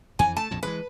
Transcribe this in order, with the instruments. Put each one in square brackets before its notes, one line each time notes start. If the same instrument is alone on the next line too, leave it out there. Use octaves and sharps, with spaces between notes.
[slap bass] F2 E3 [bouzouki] G#5
[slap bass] A3 [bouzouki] A5
[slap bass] A#1 F2 A2
[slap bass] E3 F3 G#3 [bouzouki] B4